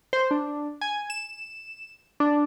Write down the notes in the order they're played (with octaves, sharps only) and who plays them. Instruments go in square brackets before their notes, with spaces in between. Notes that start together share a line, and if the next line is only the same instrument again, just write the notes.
[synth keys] C5
D4
G#5
E7
D4